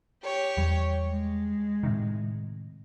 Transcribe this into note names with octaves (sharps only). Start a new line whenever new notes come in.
G4 C#5
E2 G3
G#3
A2 C3 D#3